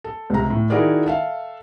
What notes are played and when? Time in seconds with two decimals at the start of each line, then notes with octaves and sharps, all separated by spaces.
0.04 A4
0.30 C#2 C3 A#5
0.50 A2
0.70 D#3 E4 F#4 G#4 A#4 D5
1.06 A4 E5 F5